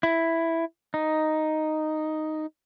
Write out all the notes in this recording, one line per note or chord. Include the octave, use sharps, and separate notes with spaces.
E4
D#4